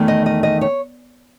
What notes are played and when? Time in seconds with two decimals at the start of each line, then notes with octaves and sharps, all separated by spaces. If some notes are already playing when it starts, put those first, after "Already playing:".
Already playing: E2 D#3 A3
0.08 D#5
0.26 D#5
0.43 D#5
0.61 C#5